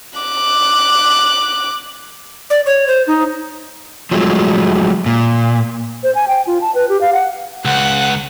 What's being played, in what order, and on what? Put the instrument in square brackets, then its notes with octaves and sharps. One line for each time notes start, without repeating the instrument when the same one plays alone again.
[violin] D6 F#6
[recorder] D5
C#5
C5
D#4
[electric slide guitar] F3 F#3 G#3 A3
A#2
[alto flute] C5
G#5
G5
F4
A5
B4
G4
F5
F#5
[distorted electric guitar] C#2 [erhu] F#5